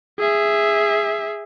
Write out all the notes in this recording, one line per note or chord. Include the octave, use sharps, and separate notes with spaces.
G#4 E5